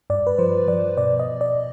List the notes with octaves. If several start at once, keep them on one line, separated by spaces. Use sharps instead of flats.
G2 D5
B4
F3 C5
F3 D5
B2 D5
D#5
B2
D5
B2